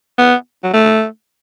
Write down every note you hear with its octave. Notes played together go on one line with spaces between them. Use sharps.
B3
F#3
A3